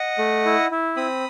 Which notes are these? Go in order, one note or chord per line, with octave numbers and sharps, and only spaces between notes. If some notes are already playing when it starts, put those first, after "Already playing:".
Already playing: D#5 F#5
A3
E4
E4
C4 B5 D#6